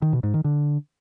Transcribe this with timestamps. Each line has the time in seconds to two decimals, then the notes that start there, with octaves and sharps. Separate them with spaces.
0.02 D#3
0.13 B2
0.23 G#2
0.34 D#3
0.44 D3